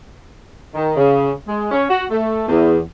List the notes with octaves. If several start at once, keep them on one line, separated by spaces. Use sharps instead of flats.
D#3
C#3
G#3
C#4
F#4
A3
E2